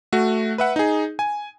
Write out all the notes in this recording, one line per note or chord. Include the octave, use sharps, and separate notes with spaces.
A3 F#4
B4 E5 F#5
D#4 G#4
G#5